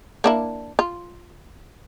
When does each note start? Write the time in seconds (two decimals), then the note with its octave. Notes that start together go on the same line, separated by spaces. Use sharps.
0.24 A#3 D4 E4
0.79 F4